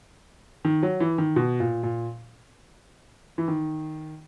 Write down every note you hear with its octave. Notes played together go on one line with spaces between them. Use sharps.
D#3
F#3
E3
D#3
B2
A#2
A#2
E3
D#3